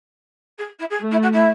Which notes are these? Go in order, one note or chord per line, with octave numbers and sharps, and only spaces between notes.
G#4
E4
G#4
A3
E4
F#4
E4